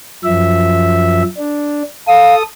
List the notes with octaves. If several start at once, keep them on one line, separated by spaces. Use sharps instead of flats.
F#2 F3 E5
D4
A4 F5 D#6